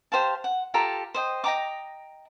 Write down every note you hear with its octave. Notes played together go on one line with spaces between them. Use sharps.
G4 C5 F5 A5
F#5
F4 G4 A4 A#5
C5 D#5 G5
D#5 G5 A#5 D6